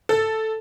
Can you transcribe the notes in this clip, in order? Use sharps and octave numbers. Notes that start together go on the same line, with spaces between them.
A4